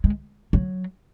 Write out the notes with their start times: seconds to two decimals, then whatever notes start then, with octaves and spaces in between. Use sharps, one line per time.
0.04 G#3
0.53 F#3